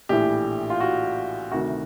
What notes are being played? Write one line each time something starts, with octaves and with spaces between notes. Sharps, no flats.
A#1 A2 E3 G4
F4
F#4
D2 C3 D#3 F#4